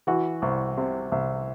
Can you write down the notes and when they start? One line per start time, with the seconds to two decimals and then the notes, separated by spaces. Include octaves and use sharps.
0.07 E3 F#4
0.42 C2
0.77 C3
1.12 C2